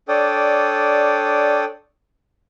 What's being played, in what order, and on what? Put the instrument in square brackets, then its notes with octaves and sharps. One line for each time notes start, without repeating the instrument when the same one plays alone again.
[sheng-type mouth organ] D4 A4 C#5 D5 G5 D#6